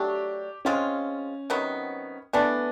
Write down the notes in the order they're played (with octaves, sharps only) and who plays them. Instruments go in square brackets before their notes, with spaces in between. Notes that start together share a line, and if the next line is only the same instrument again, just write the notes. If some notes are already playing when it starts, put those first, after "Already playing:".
Already playing: [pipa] F#3 A3 D4 [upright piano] G4
[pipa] G#3 C4 F4 [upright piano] C#4
[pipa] C3 D#3 F#3 B3
[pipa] E3 A3 D4 [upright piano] B3